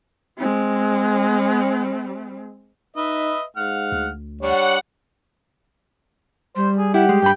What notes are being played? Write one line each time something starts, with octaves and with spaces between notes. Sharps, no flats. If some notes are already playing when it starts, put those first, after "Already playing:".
G#3 C4
D#4 B4 D#5 E5
G#2 F5 F#5 F6
D2
G3 D4 C#5 F#5
G3 C5
G#4
E4 G4 F#5
G#3
G2 G5 B5